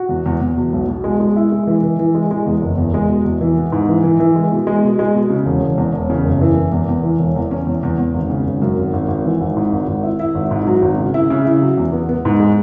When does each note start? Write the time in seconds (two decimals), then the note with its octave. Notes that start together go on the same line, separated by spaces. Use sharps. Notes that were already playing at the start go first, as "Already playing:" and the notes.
Already playing: F#4
0.09 E2
0.26 E2
0.41 E2
0.57 B2
0.73 B1
0.89 B2
1.04 G#3
1.20 G#3
1.36 E4
1.52 G#3
1.67 E3
1.83 E3
1.99 E3
2.15 G#3
2.31 G#3
2.46 E2
2.62 F#1
2.78 E2
2.94 G#3
3.09 B2
3.25 E2
3.41 E3
3.57 B3
3.72 G#2
3.89 E3
4.04 E3
4.20 E3
4.36 G#3
4.52 B2
4.67 G#3
4.83 B2
4.99 G#3
5.15 B2
5.30 C#3
5.46 E1
5.62 E1
5.78 E2
5.94 E1
6.10 C#3
6.25 F#1
6.41 E3
6.57 F#1
6.72 E2
6.89 E2
7.03 E3
7.19 E1
7.36 E2
7.51 C#4
7.67 E2
7.83 E2
7.98 E2
8.14 G#1
8.30 C#3
8.46 G#1
8.62 F#2
8.78 G#1
8.93 G#1
9.08 G#1
9.24 E3
9.41 G#1
9.57 G#2
9.72 G#1
9.87 G#1
10.03 E4
10.19 E4
10.35 G#1
10.51 G#2
10.67 F#3
10.82 G#1
10.98 C#3
11.14 E4
11.30 C#3
11.45 E4
11.62 F#3
11.78 E2
11.93 B3
12.09 B3
12.25 G#2
12.40 G#3